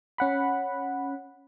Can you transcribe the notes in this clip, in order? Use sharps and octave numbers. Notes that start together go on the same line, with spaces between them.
C#4 F#5 B5